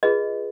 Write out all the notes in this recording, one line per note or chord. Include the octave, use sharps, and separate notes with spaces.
F4 G#4 B4 D#5